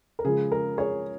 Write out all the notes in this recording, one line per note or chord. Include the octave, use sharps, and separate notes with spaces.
A#4
C#3 F3 G#3 G#4
A#4
G#4 C#5